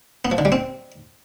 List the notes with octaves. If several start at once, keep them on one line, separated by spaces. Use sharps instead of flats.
B3
F3
D3
G3
C4